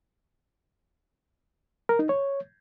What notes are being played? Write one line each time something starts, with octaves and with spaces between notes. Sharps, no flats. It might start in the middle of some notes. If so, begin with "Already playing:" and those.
A#4
D#4
C#5